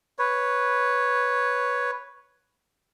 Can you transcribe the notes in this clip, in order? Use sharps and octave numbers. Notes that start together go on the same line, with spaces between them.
B4 C#5